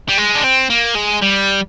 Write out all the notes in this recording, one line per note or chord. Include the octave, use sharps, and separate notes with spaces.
G3
G#3
D4
C4
A#3
G#3
G3